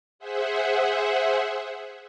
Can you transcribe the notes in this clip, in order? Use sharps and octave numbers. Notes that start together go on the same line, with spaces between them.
G#4 C5 E5 F#5